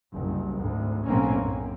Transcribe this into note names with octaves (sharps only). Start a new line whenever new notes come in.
F#1 C2
G#1 D2
B1 F#2 A2 A#3 C4 C#4
F#2